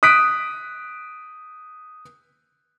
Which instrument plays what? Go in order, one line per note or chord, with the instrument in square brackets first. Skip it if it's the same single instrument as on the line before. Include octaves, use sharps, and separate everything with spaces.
[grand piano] D#6 F#6 B6 D7